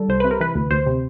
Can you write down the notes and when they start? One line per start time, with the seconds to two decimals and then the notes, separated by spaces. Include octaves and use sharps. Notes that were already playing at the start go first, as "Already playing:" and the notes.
Already playing: D#3 G3 A4
0.09 C2 C5
0.20 C3 B4
0.31 A#4
0.40 E3 B4
0.55 D2
0.71 D2 C5
0.87 C3